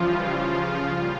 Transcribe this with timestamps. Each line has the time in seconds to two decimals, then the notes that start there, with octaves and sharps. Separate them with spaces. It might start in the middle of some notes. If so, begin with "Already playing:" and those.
Already playing: C#3 E3 F3 G3 F4
0.31 C#3 F3
0.86 A#2 G3